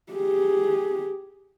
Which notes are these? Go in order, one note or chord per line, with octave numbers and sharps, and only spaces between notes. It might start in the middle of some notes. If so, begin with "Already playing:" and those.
G4 G#4